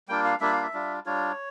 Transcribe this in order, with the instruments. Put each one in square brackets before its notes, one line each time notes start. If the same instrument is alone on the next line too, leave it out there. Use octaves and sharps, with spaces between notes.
[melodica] G3 A#3 D4 F4 G5
F5
G3 A#3 D4 F4 E5
F5
E5
G3 D4 F4
G3 D4 F4 C#5